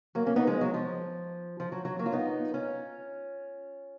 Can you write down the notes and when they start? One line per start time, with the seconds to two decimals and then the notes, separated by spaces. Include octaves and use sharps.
0.15 F#3 A#3
0.26 A#3 C#4
0.36 B3 D#4
0.47 F3 G#3
0.61 F#3
0.74 F3
1.60 F3
1.72 F#3
1.85 F#3
1.99 F#3 A#3
2.06 F4
2.12 B3 D#4
2.54 C#4 F4